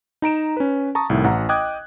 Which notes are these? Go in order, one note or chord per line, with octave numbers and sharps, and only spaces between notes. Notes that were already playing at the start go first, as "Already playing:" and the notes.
D#4 A#5 D7 E7
C#4 B4
A5 A#5 C#6 D#6
C2 A2 D#3
A1 F#5 A#5
D#5 G5 D6 D#6 F#6 G#6